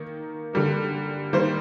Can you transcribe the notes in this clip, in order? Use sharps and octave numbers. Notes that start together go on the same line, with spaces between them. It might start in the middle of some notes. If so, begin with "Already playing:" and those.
Already playing: D#3 A#3 A#4
D3 G3 A#3
D#3 G3 A#3 C5